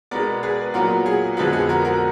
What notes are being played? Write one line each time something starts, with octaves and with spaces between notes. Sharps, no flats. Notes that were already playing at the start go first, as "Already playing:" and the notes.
B2 G#3 B3 A#4 D5
G#4 B4
A#2 F#3 B3 F#4 A#4
G#4
F2 D3 G#3 B3 F#4
G#4
F#4 A#4
F#4 A#4